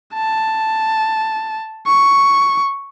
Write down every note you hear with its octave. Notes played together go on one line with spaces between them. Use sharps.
A5
C#6